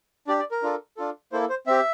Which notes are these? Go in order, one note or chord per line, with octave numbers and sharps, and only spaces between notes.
D4 G4 D5
D5
A#4
D4 F4 A4
D4 F4 A4
A#3 E4 A4 C5
C5
C4 G4 E5